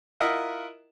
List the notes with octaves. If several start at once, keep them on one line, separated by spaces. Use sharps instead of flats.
E4 F4 A#4 D#5 E5 F#5